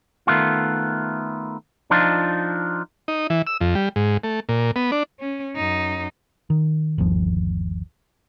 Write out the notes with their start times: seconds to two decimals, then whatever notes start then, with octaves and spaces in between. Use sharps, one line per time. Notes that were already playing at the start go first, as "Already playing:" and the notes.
0.27 D#3 A3 B3 F4
1.90 F3 D4 D#4 F4
3.08 D#4
3.30 E3
3.47 E6
3.61 F2
3.75 G3
3.96 G#2
4.23 A3
4.49 A#2
4.76 B3
4.92 D4
5.19 C#4
5.56 F#2 D#4
6.50 D#3
6.98 G1 D#2 F3